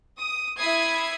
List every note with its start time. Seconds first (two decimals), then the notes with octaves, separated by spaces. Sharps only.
0.19 D#6
0.58 E4 E5 B5 D#6 G#6 C7